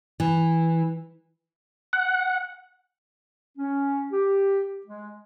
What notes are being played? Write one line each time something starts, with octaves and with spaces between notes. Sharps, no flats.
E3
F#5
C#4
G4
G#3